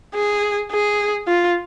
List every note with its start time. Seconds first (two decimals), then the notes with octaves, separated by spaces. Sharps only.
0.15 G#4
0.71 G#4
1.28 F4